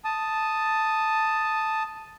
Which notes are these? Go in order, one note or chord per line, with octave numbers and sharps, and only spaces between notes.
A5 D#6